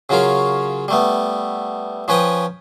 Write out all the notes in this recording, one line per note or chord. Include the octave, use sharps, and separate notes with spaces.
C#3 F#3 C#4 F4 A#4
G3 A3 B3
F3 C#4 B4 G5 D#6